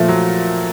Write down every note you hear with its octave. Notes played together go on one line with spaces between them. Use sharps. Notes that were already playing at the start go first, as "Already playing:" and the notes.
Already playing: A#2 F3 A3
F#3